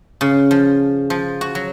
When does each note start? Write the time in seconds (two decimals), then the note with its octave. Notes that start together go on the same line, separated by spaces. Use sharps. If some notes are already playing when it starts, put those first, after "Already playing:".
0.21 C#3
0.51 F3
1.10 F3
1.41 F#4
1.55 F#3